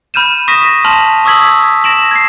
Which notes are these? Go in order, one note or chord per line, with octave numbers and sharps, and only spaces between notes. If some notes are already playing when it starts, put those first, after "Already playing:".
B5 F6 G6 D#7 E7
C#6 D#6 A#6 B6 D#7 E7
A5 C6 F6 F7 F#7
C#6 D#6 E6 G#6 B6 F#7
A#6 D7 E7 F#7
G#6 C7